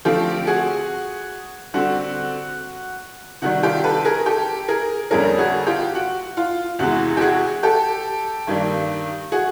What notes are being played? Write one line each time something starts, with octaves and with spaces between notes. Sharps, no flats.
D3 F3 A3 C4 F4 G4
F#4 G#4
D3 G3 C4 F#4
C3 D#3 G3 F#4
F4 G4
A4 B4
G#4 A#4
G4 A4
G#4 A#4
F2 D3 G3 A#3 C#4 G#4 A#4
F#4 G#4
F4 G4
F#4
F4
E2 C3 E3 G#3 F#4
G4
F#4 G#4
G4 A4
G2 D#3 G3 A#3
F#4 G#4